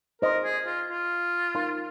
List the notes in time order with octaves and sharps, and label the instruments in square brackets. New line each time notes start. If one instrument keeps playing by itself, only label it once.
[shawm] A#4 [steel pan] C5 D#5 C6
[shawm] G#4
F4
F4
[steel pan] D#4 A#4 F5 C6